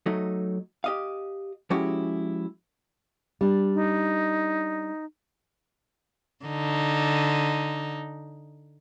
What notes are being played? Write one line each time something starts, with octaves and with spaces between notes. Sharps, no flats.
F#3 A3 D#4
G4 D#5 F5
F3 G#3 C#4 E4 F#4 G4
G3 D4
D#4
D3 D#4